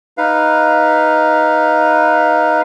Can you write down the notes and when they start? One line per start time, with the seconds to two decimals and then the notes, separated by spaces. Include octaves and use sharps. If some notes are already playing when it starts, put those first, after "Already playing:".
0.18 D#4 B4 F5